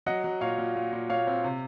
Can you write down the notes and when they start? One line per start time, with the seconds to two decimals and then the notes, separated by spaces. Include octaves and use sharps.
0.06 F#3 D#5 F#5
0.24 F#3
0.41 A#2 C#5 F5
0.58 A#2
0.76 A#2
0.93 A#2
1.09 A#2 C#5 F5
1.27 C4
1.44 C3